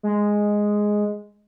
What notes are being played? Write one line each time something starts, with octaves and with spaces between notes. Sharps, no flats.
G#3